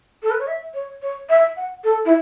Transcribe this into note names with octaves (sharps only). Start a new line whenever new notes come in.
A4
B4
C#5
E5
C#5
C#5
E5
F#5
A4
E4